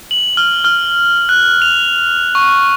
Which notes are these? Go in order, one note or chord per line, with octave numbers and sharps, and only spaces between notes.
F#7
F6
F6
F#6
F7
C#6